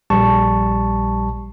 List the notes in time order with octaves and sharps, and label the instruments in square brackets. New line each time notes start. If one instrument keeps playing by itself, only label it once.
[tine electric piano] A#1 G3 A5 C#6